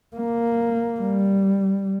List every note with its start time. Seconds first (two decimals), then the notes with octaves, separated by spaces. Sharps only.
0.16 A#3
1.00 G3